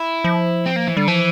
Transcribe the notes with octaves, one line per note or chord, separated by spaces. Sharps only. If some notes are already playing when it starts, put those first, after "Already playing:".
Already playing: E4
F3
C4
A#3
E3
D3 G3
E3 F3